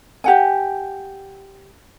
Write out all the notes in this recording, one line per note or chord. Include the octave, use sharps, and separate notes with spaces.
G4 F#5 G#5